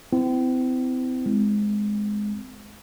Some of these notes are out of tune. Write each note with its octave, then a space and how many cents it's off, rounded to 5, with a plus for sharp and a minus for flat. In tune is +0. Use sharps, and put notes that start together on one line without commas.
C4 -35 E4 +0
G#3 +0 C4 -25